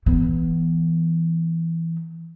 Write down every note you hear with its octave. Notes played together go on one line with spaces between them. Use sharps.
E3 B3